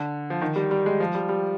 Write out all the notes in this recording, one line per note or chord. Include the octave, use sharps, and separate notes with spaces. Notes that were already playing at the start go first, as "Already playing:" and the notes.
Already playing: D3
F3
D#3
G3
G3
G#3
F3
G3
G3